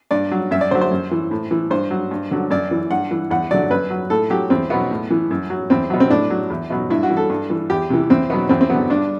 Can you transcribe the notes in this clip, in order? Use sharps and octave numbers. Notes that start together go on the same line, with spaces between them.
G2 D5
F#3
F#2 E5
D5
D3 F#3 C5
C5
F#2
E3
A2
E3
G2 C5
F#3
G2
D3 F#3
F#2 D5
E3
G2 F#5
E3
E2 F#5
D3 F#3 D5
F#2 B4
F#3
A2 A4
F#3 G4
E2 C4
B2 F#3 B3
A2
E3
F#2
F#3
E2 C4
B2 F#3
C4
A2 D4
F#3
E2
B2 F#3
G2 E4
F#4
E3
A4
G2
E3
E2 G4
C3 E3
E2 C4
B2 F#3 B3
E2 C4
C4
D3 F#3 B3
G2 D4